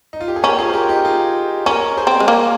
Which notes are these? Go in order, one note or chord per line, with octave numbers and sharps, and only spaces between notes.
D#4
F4
G4
G#4
C#4 G4 A#4
F4 G#4
C5
G4 A#4
D#4 G4
F4 G#4
C#4 A#4 C#5
G#4 C5
C4
G#3
A#3